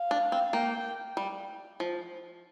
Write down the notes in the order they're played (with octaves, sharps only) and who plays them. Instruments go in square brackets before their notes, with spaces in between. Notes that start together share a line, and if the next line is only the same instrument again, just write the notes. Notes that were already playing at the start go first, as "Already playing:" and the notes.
Already playing: [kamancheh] F5
[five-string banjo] D4
C4
[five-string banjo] A#3 [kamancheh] G5
[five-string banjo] G3
F3